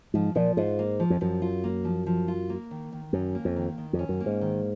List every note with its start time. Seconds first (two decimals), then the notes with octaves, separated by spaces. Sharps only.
0.14 G#2 F3
0.35 A#2 F3
0.57 G#2 F4
0.79 A#3
1.00 F3
1.10 F2
1.21 F#2 F3
1.42 F4
1.64 A#3
1.85 F3
2.06 F3
2.28 F4
2.50 A#3
2.71 D#3
2.92 D#3
3.13 F#2 C#4
3.35 A#3
3.45 F2
3.56 D#3
3.78 D#3
3.93 F2
3.99 C#4
4.09 F#2
4.20 A#3
4.26 G#2
4.41 D#3